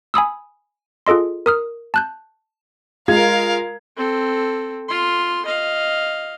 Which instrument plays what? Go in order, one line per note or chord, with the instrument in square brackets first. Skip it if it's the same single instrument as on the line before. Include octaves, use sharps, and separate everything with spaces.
[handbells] G#5 B5 D#6 E6
F4 G#4 A4 D#5 C6
A#4 D#6 F6
A5 F#6 G6
[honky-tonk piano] G#3 F4 G#6 [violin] A#4 F5
[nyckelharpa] C4 A4
F4 C6
D#5 F5